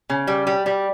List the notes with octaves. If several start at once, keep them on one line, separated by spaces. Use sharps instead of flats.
C#3
G3
G3
G3